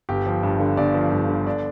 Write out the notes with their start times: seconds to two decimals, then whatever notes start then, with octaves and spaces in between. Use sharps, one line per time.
0.09 G1 G4
0.26 F3
0.43 G2
0.60 D3
0.77 G1 D5
0.95 F3
1.12 G2
1.29 D3
1.47 D4